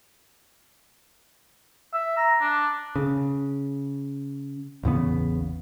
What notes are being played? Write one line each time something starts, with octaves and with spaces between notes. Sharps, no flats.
E5
A#5
D4
C#3
A1 E2 C#3 B3